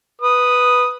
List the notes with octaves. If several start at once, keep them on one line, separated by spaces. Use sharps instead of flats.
B4 D#6